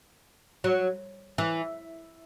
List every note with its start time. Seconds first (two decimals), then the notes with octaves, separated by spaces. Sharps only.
0.64 F#3
1.38 E3